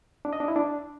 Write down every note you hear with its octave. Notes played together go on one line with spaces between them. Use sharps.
D4
D#5
D4
E4
D4